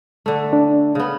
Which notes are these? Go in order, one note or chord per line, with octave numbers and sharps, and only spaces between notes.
D3 A3
D4
C#3 B3